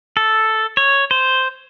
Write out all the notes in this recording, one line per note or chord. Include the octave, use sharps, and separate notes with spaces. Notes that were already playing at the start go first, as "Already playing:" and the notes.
A4
C#5
C5